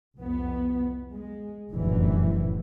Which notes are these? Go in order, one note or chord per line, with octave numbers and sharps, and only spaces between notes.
C2 F2 B3
G#3
F1 A#1 F#2 A2 D3 E3